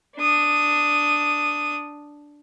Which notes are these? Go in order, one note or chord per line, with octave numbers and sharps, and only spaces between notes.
D4 D#6